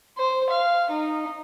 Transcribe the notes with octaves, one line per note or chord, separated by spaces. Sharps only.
C5
F5
D#4